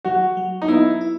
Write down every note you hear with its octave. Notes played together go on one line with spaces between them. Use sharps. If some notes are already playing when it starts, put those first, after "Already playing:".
F#3 F#4
F#3
D#4
B3 E4
E4